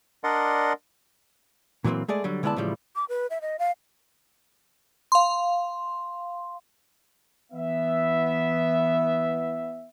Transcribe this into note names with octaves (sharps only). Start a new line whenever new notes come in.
D4 A#4 D5 D#5 F#5 C6
A#2 E3 F#3 G#3 A#3 C4
G#3 A3 G#4 D5
D3 F#3 G3
D3 G#3 B3 E4 D5 A5
A2 C#3 E3 F3 G3 G#3
D6
B4
E5
D#5
F5
F5 C6
E3 B3 E5